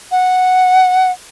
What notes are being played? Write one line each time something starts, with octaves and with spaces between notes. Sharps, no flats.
F#5